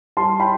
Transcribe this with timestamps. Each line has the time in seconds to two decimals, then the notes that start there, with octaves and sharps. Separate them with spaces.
0.17 G3 A5 C6
0.40 G5 B5